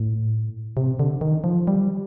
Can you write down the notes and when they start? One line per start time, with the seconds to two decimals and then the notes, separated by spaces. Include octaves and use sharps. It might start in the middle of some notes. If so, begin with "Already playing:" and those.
Already playing: A2
0.77 C3
0.99 D3
1.21 D#3
1.44 F3
1.67 G3